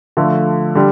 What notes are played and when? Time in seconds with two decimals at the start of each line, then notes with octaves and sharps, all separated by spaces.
0.17 D3 F3 A3
0.75 D3 G3